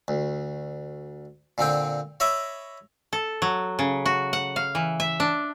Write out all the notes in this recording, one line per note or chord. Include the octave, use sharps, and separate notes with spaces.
D2
A#2 D3 C4 G5
C#5 D#5 E5 B5 C#6 D6
A4
F#3
C#3
F#4
F#5
F5
E3
E5
D4